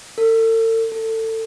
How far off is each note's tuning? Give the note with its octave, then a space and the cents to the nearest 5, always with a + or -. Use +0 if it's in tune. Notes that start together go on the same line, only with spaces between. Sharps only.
A4 +40
A4 +25